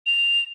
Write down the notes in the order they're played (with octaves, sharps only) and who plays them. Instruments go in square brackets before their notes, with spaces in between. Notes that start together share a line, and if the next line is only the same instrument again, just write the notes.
[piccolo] F7